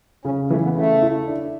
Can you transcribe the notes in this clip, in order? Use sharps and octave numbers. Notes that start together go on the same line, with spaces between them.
C#3 C#4
E3 A3
B3
C#3 A3
E4
D4